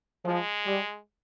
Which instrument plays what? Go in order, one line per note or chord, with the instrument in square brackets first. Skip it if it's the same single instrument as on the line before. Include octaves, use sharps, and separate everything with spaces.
[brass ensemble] F3 [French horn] G#3
[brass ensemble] G3